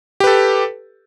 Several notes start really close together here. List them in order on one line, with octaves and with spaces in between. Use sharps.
G4 B4 A4